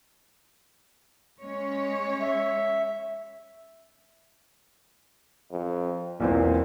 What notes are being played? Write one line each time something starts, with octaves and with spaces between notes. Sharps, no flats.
G#3 C#4 C#5
E5
F2
B1 E2 A#2 C4